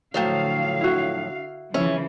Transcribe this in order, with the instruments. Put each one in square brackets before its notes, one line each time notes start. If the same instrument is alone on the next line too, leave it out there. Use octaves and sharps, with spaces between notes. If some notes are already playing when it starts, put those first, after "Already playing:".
[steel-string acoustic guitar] A2 F3 F#3 [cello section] D3 F5
[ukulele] E4 F#4
[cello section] C#3 E3 F3 [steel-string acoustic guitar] C#4 [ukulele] E5